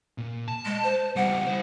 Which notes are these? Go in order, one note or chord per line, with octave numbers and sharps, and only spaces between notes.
A#2
A5
G#3
C5
C#2 G3 F#5
E4 C5